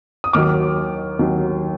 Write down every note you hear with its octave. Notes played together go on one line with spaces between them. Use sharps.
D#6
D#2 D#3 F#3 D6 F6
D#2 D#3 F#3